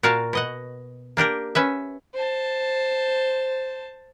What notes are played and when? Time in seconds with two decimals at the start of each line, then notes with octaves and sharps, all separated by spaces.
0.03 A#2 F#4 A#4 F5 A5
0.33 B2 D#5 F#5
1.17 A#3 D4 G4 A#4
1.55 C#4 B4 E5
2.14 C5 A5